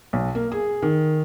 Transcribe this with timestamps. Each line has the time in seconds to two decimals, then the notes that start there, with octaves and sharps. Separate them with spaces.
0.13 B1
0.35 A#3
0.52 G#4
0.82 D#3